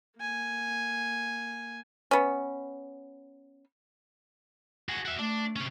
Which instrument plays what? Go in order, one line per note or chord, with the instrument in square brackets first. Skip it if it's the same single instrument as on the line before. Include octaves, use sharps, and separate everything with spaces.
[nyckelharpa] A#3 G#5
[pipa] B3 C#4
[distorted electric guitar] F#4 G#4
F#4 E5
[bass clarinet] A3 [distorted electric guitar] D4
[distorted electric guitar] C3 C#4